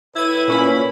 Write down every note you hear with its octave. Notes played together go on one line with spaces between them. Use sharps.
A2 E4 B4 G#6 D#7
A#2 C#4 B5